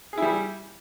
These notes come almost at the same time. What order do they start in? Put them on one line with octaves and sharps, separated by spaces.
G#4 E4 G3